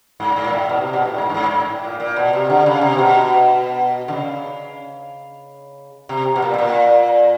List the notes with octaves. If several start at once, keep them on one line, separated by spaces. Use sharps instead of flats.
G#2
G#2
A#2
A2
B2
C3
B2
A2
G#2
G2
G#2
G#2
A2
A#2
A#2
B2
C3
D3
C#3
C3
B2
D3
C#3
C3
B2
A#2
B2
A#2